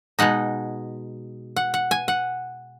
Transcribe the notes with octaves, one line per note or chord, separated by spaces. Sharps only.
B2 G#3 D#4 F#5
F#5
F#5
G#5
F#5